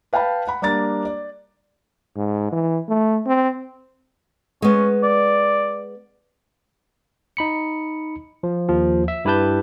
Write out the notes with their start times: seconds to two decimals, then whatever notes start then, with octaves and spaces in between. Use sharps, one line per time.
0.13 B4 F5 G5 A5 B5
0.48 F#5 B5
0.62 G3 A#3 D4 A#5 A6
1.05 D5
2.16 G#2
2.52 E3
2.88 A3
3.26 C4
4.62 G#3 B3 C#4
5.03 D5
7.37 D#4 B5 C#7
8.43 F3
8.69 D#2 F3 F4
9.08 E5
9.25 G2 E4 G4 B4 A5 G6